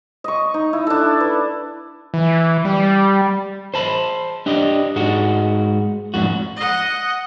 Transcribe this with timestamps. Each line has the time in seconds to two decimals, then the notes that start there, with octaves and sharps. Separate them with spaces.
0.24 D#5 C#6
0.54 D#4
0.73 E4
0.87 D4 A4
1.20 B4
2.14 E3
2.65 G3
3.74 C5 A5 B5
4.46 D4 G4 D5 D#5
4.96 G#2 G#3 F#4
6.14 F2 G#2 F#4
6.56 D#5 F#5